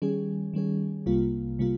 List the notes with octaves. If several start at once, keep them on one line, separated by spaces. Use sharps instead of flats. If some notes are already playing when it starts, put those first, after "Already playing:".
D#3 G3 C#4 G#4
D#3 G3 C#4 G#4
C2 C3 G3 A#3 F4
C3 G3 A#3 F4